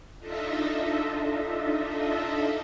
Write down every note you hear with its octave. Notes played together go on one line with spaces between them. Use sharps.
D4 D#4 F4 A4 D#5 E5